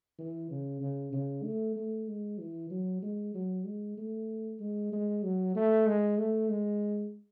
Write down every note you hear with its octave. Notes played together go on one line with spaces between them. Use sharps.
E3
C#3
C#3
C#3
A3
A3
G#3
E3
F#3
G#3
F#3
G#3
A3
G#3
G#3
F#3
A3
G#3
A3
G#3